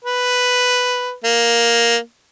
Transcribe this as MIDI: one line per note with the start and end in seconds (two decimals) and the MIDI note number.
0.05 1.14 71
1.24 1.97 58